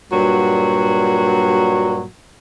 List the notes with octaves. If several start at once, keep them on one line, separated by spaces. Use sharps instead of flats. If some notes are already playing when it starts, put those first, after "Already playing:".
G2 A#2 F#3 F#4